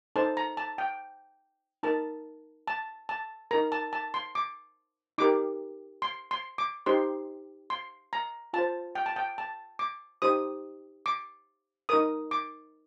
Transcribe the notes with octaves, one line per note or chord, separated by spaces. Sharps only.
D#4 A4 C5 A5
A#5
A5
G5
D#4 A#4 A5
A5
A5
D#4 A#4 A#5
A5
A5
C6
D6
D#4 G4 A#4 D6
C6
C6
D6
D#4 G4 C5 C6
C6
A#5
F4 C5 A5
G5
A5
G5
A5
D6
D#4 G4 C5 D#6
D6
D#4 A#4 D#6
D6